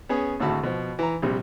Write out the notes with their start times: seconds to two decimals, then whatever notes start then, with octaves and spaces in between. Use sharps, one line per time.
0.09 B3 C#4 G#4
0.40 G#1 D2 A2 F#4 A5 B5
0.63 B2 F3
0.99 E3 A#5
1.22 A#1 C3 G3